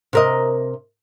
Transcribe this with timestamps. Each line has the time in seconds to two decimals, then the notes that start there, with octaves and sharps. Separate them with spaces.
0.13 C3 A#4 D#5